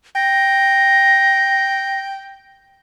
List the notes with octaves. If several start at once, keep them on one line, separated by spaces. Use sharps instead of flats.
G5 A#6